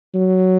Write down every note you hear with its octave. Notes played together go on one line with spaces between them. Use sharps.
F#3